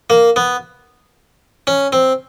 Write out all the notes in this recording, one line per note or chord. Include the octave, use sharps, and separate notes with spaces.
A#3
B3
C#4
C4